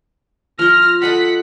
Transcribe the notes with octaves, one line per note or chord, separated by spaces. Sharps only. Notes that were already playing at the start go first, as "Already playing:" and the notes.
F3 F4 F6 A#6
A4 D#5 F#5 B5 B6